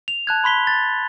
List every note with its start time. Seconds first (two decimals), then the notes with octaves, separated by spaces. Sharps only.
0.08 F7
0.27 A5 F#6 G#6
0.44 B5 C6 B6 G7
0.67 A6